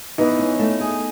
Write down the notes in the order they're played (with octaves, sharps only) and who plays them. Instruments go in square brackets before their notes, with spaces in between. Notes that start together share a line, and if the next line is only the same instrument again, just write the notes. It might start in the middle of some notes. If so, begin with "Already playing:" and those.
[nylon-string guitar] E3 [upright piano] B3 D#4
[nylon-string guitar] C#4
A3
G#4